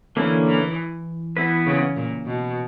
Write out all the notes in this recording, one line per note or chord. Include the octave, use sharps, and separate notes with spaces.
D3 E3 A#3 C#4 E4
E3
E3 B3 E4 B4
C#3
A#2
B2